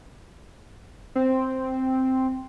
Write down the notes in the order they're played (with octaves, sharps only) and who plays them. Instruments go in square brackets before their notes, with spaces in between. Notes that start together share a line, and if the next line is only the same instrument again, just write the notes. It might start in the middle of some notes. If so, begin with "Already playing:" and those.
[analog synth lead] C4